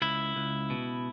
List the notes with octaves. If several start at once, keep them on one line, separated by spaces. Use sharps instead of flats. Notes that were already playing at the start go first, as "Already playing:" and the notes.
C#2 E4
C#2
B2